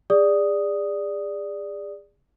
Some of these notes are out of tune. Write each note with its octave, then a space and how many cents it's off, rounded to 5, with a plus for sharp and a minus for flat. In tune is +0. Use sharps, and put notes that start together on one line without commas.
G#4 -30 D5 +0 D#6 +0